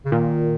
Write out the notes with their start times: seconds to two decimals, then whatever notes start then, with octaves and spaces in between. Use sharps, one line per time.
0.05 C#3
0.12 A#2 D#3